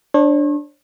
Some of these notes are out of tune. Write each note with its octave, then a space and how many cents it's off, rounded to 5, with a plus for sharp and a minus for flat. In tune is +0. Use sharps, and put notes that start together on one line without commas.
D4 +0 C#5 -40